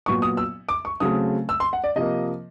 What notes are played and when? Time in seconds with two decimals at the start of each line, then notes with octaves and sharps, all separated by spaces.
0.06 A#2 F#3 B3 C#6
0.22 D#6
0.37 E6
0.69 D6
0.85 C#6
1.00 C#3 F#3 A3 C4 D#6
1.49 E6
1.60 C6
1.73 F#5
1.84 D5
1.96 C3 F3 A#3 D#5